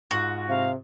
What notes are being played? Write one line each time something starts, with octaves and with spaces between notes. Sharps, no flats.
G#2 F4 F#4
C3 F5